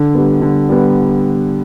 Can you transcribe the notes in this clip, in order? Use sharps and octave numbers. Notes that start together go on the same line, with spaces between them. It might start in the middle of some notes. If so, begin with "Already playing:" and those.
Already playing: D3
G3 B3
D3
G3 B3